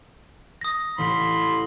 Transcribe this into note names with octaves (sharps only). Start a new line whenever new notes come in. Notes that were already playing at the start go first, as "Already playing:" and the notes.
D#6 A#6
A1 B5 C6